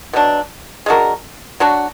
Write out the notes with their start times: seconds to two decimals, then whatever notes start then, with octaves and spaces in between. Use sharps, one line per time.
0.13 B2 F#3 D4
0.86 G#3 D4 F#4 A#4
1.60 F#3 D4 F#4